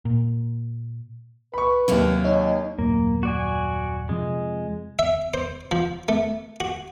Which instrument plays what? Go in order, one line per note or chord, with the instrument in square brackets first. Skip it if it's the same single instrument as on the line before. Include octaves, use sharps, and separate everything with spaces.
[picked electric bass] A#2
[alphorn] B4 [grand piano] B5 C#6
[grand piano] D#2 C3 [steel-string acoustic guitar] F#3 A#3 C#4
[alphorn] D#4 [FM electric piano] C#5 D#5
[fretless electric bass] D#1 F#2 [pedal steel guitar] A#3
[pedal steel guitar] F#4 D5 G#5
[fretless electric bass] F2 C3 F3 [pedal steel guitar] G#3
[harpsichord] E5
C5
F3
A3
F#4